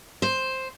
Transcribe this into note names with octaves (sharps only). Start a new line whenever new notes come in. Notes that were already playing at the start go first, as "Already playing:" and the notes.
C5